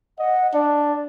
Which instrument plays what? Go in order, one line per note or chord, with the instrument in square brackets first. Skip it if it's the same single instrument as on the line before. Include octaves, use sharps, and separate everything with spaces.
[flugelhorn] D#5 [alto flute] F#5
[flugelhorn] D4 [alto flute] D5